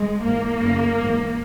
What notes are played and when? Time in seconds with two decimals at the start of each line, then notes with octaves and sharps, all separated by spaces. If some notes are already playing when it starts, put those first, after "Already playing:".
Already playing: G#3
0.23 G#2 E3 A#3
0.60 F#2 C#3 E3
0.99 G#2 E3